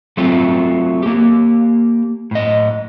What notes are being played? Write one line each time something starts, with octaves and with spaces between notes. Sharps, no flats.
F#3 A3 C4 F4
A#3 G4
A2 D#5